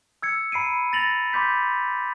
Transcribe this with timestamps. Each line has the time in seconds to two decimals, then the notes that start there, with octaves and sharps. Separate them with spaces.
0.22 E6 G#6 C#7
0.52 A#5 B5 C7 D7 D#7
0.93 A6 A#6 F7 F#7
1.33 B5 C6 D6 G6 B6